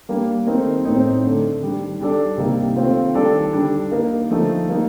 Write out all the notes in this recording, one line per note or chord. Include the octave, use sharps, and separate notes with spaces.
G3 A#3 D4
D#3 A3 C4 D#4 A#4
A2 A3 C4 D#4
D3 A3 D4
D#3 G3 D4
G3 D4 A4 D5
C3 G3 A#3 D#4
D#3 A3 C4 F4 C5
D#3 G3 D4 A4 D5
D3 G3 D4
A#3 D#4 A#4
D3 F3 A3 D#4 A4
G3 A#3 D#4